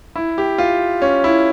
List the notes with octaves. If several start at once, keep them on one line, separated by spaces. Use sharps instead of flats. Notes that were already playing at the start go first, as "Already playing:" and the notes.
E4
G4
F4
C#4
E4